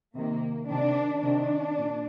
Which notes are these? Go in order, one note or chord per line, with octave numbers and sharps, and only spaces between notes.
C3 D#3 A#3
C3 D#3 D4
C3 D#3 D4
A#2